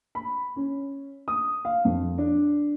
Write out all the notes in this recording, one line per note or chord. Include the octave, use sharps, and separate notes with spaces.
B5
C#4
D#6
F5
F2
D4